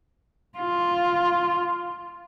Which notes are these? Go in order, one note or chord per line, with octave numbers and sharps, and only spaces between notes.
F4